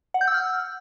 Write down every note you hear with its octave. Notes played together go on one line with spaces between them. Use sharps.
F#5
G6
E6
F6